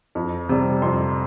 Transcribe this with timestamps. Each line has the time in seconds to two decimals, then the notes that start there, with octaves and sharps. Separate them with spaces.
0.15 F2
0.49 C3 G3
0.82 F2 C6